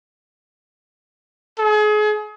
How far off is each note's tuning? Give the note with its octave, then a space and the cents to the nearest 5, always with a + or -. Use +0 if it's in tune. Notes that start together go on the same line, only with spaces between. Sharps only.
G#4 +35